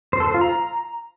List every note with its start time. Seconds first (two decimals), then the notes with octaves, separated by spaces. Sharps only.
0.13 C5
0.20 A4
0.27 C5
0.34 F4
0.41 A#5